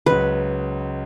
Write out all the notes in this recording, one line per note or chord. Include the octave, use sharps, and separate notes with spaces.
C#2 C#3 F#3 B4